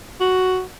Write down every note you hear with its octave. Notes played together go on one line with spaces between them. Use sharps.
F#4